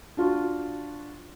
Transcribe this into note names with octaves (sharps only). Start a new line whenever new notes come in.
D4 F4 F#4